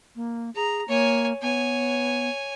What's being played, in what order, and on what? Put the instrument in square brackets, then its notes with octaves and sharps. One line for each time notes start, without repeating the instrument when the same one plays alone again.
[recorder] A#3
[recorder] G#4 [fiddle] A#5
[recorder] A#3 [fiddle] C#5 G#5
[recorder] B3 [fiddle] C#5 G#5